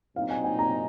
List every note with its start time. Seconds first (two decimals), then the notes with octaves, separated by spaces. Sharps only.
0.16 A#2 F#3 C4 D#4 F5
0.30 G#5
0.44 G#5
0.59 A#5